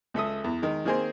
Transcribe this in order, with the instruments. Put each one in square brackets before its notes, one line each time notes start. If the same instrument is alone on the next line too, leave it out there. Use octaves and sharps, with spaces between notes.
[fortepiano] C#2 A4 E5 D#6
E2
D#3 G#3
D#3 A#3 C4 G#4 A#4 C5